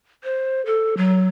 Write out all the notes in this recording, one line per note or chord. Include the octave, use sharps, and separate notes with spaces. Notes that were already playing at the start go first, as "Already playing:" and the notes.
C5
A4
F#3